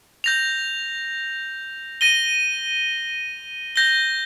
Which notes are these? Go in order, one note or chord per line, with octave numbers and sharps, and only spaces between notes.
G6 A#6 F7
A#6 D#7 G7
G6 A#6 G7